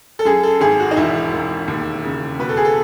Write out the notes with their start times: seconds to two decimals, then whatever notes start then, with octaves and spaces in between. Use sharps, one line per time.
0.19 A4
0.25 F#2 G#4
0.43 A4
0.61 G#1 G#4
0.80 F#4
0.91 D#4
0.96 E1 E4
1.33 E1
1.68 D#2
2.04 C#3
2.39 B2 B4
2.49 A4
2.57 G#4
2.65 A4